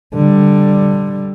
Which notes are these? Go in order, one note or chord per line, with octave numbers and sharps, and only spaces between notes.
D3 G3